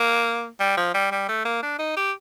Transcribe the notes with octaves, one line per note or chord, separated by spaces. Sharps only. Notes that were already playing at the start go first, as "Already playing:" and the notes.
Already playing: A#3
G3
F3
G3
G3
A3
A#3
D4
D#4
G4